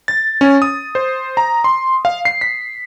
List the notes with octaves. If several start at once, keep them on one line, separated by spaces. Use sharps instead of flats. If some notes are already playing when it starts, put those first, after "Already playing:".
A6
C#4
D#6
C5
A#5
C6
F5
C7
B6